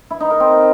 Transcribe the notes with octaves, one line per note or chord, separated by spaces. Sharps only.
E4
D#4
A#4
C4